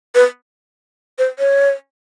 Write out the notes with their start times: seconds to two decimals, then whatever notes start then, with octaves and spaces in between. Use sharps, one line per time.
0.15 B4
1.19 C5
1.39 C#5